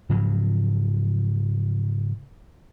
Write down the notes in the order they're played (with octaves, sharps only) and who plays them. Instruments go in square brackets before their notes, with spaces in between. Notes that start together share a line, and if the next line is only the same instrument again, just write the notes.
[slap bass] G#2 C#3 F3 F#3